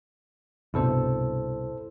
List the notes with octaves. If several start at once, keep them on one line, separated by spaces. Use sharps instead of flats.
C2 G2 B2 E4 A4 C5